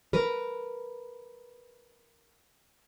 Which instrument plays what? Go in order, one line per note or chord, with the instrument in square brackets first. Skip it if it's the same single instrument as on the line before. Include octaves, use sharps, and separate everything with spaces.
[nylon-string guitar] A#4 B4